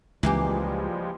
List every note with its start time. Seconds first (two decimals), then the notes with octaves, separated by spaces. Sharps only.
0.23 C#2 E3 F3 G3 G#3 A#3 G4